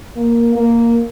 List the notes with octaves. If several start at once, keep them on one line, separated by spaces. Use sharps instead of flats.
A#3
A#3